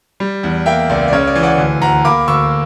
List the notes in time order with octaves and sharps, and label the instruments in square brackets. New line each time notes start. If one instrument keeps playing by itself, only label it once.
[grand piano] G3
E2
A#3 E5 G5
C#2 D5
D5
C#3 C#5
D5
E3
D5 F#5
D2
D2 F#5 A#5
A#3 B5 D6
D2 C#6 E6